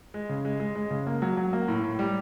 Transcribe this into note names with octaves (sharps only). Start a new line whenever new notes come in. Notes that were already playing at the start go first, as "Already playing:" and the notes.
G#3
C#3
G#3
G#3
G#3
C#3
A#3
F#3
F#3
A#3
A2
A2
G3